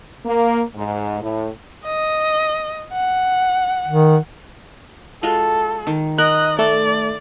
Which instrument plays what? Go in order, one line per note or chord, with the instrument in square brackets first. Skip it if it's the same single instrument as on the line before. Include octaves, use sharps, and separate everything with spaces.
[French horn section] A#3
G#2
A2
[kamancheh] D#5
F#5
[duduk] D#3
[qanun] G#3 F4 F#4 [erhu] A4
[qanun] D#3
[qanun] A#4 [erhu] D#5 [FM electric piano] F#6
[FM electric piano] A3 [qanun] A4 [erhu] D5